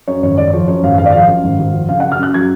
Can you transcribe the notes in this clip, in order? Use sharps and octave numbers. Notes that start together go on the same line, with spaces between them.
F#2 C#5
G#1 C#5
G#1 D5
F3 C#5
F#2 C#5
G#1 F5
G#1 F5
D5
F3 F5
F#2
G#1
G#1
F3
C#3 F5
F#2 F#5
F6
F#2 F#6
F#3 G#6